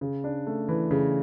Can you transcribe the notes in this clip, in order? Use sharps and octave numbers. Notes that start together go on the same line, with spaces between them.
C#3
D4
A3
E3
C#3